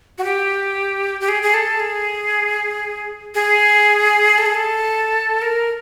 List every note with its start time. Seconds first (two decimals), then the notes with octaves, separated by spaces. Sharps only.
0.18 F#4
0.24 G4
1.21 G4
1.29 G#4
1.43 G#4
1.54 A4
1.80 G#4
3.35 G#4
4.38 A4
4.46 G#4
4.54 A4
5.42 A#4